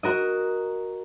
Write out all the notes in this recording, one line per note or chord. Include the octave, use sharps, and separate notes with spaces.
F#4 A#4 D#5